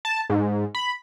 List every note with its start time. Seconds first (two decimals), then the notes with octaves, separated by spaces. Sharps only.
0.05 A5
0.30 G#2
0.75 B5